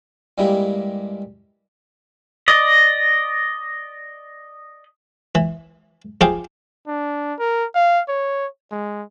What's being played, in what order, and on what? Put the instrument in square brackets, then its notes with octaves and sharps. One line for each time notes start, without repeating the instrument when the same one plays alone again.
[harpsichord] G2 G3 G#3 A#3 E4 G4
[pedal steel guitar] D5 D#5
[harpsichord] E3
F3 G4 G#4 F5
[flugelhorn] D4
A#4
F5
C#5
G#3